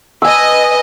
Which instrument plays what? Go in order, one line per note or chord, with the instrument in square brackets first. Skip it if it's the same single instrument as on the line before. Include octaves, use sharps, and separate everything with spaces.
[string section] B4 D#5 [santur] G#5 E6